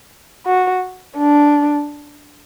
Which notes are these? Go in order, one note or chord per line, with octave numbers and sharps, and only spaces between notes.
F#4
D4